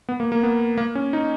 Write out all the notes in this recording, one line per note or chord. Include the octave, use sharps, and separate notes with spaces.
B3
A#3
A#3
B3
A#3
C#4
D#4